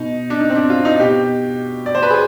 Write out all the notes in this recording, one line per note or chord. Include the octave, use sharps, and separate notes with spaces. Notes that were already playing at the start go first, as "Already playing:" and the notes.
Already playing: B2 D#4
D4
D#4
C4
D4
F4
D#4
B2 G4
D5
C5
B4
G#4